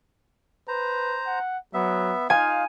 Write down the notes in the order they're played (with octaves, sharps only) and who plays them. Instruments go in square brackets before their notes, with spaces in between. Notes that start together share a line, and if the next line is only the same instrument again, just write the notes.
[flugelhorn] B4 [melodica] C5 A#5
[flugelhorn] F#5
[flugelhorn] F#3 [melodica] B3 E5
[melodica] D#4 F4 [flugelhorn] F5 [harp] G#5